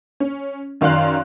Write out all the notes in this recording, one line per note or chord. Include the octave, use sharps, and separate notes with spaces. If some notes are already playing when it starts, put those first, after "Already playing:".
C#4
F#2 D#3 D5 F5 C6 F#6